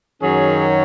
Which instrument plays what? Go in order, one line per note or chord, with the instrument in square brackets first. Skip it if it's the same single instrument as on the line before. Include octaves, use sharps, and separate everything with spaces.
[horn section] F#2 D#3 F#3 C#4 G#4